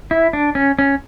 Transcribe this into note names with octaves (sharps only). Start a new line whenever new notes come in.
E4
D4
C#4
C#4